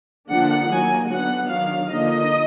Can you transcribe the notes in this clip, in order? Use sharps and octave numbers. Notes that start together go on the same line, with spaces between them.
D3 F3 A#3 D4 F#5
D#3 F#3 A#3 D#4 G#5
D3 F#3 B3 D4 F#5
D#3 F#3 D4 F5
D3 F3 A#3 D#4 D#5